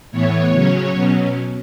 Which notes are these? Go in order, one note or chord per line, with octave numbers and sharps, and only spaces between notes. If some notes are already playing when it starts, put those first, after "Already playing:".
A2 E3 B3 C#5
C#3 F#3 C#4
B2 F#3 C#4